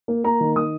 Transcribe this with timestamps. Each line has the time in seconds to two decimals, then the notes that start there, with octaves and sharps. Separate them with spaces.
0.08 A#3
0.24 A#3 A#5
0.40 D#3
0.56 D#3 D#6